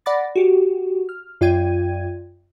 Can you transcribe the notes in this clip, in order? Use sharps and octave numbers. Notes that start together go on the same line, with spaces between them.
D5 F#5 B5 D6 A6 A#6
F#4 G4
F6
F#2 F4 D5 G5 G#6 D#7